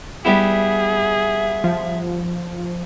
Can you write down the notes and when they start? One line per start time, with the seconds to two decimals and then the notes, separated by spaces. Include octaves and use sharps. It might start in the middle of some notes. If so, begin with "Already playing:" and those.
0.25 G3 B3 E4 G#4 E5
1.64 F3